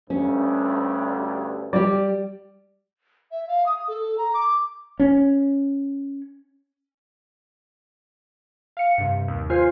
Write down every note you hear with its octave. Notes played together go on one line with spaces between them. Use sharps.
D2 G2 C#4
G3 G4 D5
E5
F5
D#6
A4
A#5
D6
C#4
F5 C#7
G2 C3
D#2
F4 C5 G#5 F6 C7